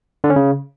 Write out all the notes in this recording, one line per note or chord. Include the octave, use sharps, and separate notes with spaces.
D3
C#4
C#3